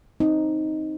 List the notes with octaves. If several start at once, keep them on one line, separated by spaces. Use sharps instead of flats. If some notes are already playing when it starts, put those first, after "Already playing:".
C4 D#4